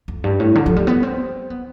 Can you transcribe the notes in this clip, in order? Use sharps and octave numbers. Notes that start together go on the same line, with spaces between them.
F2
G2
A2
D3
F3
G3
B3
C4
B3